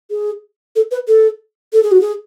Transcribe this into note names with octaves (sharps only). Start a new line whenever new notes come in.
G#4
A4
B4
A4
A4
G#4
F#4
G#4